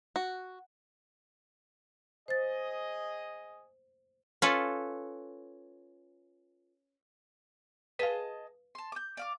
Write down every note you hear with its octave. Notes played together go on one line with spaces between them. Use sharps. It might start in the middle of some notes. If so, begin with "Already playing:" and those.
F#4
G#4 C5 D#5 A6
C#4 F4 A4 B4
G#4 B4 D#5 F5 A5
A5 C6
D6 G6
D5 F5 D6